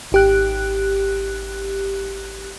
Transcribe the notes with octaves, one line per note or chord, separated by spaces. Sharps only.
G#1 G4 F#6